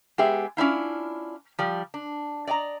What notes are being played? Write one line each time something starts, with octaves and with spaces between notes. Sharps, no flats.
G#3 B3 G4 G#4 E5
C#4 D4 E4 F4
F3 G3 D5
D4
D5 D#5 G#5 A#5